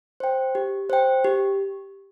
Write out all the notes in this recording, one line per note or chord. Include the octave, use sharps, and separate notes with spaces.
C5 G5
G4
C5 G5
G4